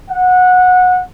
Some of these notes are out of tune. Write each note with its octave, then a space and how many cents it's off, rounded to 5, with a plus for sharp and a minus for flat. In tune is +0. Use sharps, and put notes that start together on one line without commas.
F#5 -20